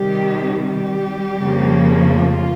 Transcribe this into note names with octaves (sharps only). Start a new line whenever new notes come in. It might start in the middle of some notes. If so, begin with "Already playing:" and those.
Already playing: C3 D#3 G3 G4
G3 G4
F2 C#3 F3 A#3
F4